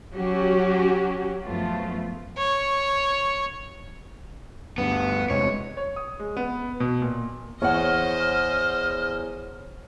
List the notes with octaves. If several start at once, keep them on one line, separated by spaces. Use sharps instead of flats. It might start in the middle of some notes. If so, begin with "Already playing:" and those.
F#3 C#4 F#4 G4
F#2 F3 A3 B3 F4
C#5
D2 G2 B3
E2 C3 G#3 C#5
C#5
D#6
G#3
B3
B2
A#2
E2 C5 C#5 D#5 F#5 F6